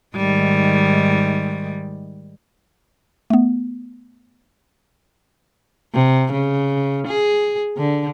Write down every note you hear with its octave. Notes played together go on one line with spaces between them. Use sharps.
G#2 D#3 G3
A3 B3
C3
C#3
G#4
D3